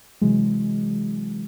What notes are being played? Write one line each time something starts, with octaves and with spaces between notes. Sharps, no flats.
C3 E3 F#3 G#3